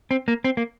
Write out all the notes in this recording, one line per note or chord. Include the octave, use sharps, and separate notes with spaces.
C4
A#3
C4
A#3